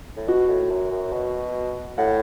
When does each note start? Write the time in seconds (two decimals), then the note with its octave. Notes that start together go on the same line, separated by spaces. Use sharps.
0.17 A2
0.27 B2 F#4
0.49 A2
0.71 F#2
0.92 F#2
1.13 B2
1.98 A2 F#5